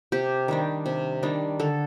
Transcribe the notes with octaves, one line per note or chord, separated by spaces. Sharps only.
C3 G4
D#3 G3 D4
C3
D#3 G3 D4
D3 A4